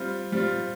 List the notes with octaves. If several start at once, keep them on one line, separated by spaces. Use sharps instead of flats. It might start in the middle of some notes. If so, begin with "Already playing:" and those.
Already playing: G3 C4 F4
G3 C4 F4